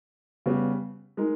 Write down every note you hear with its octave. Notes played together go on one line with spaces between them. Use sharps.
C#3 G3 B3 G4
G#3 D#4 A#4